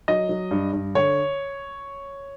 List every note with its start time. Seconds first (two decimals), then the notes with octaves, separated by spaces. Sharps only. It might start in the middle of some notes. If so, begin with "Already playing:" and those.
0.08 F#3 D#5
0.29 F#3
0.51 G2
0.73 G2
0.95 D3 C#5